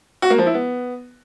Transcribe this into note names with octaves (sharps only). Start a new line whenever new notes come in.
F#4
A#3
F3
E4
B3